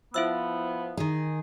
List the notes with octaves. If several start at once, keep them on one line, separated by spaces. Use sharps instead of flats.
F3 B3 E4 E5 E6
D#3 G#4